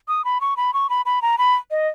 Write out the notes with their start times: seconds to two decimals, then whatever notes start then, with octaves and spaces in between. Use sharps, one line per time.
0.08 D#6
0.25 B5
0.41 C#6
0.57 B5
0.74 C#6
0.90 B5
1.06 B5
1.22 A#5
1.38 B5
1.71 D#5